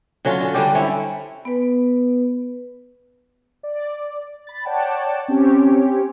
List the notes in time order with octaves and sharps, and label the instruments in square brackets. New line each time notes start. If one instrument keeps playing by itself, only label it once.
[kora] D3 F#3 C#4 F4
D3
D3 G3 G4
C4 C#4 E4
[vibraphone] B3 B4
[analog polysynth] D5
B5 A6
C#5 D5 F#5 G5 A5
C4 C#4 G4 C#5